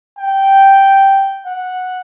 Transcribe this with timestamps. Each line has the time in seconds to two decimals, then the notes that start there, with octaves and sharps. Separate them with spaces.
0.19 G5
1.47 F#5